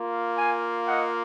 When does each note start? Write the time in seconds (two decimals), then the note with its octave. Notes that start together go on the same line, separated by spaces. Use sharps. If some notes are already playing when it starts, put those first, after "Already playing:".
Already playing: A#3 F4
0.38 F5 G#5
0.88 D#5 F#5